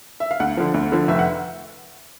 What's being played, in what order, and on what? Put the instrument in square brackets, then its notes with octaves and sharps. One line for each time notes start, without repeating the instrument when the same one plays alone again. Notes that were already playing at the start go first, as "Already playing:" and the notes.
[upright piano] E5
F5
D2 F#5
D3 F3
D2
D3 F3
F1 E5
F#5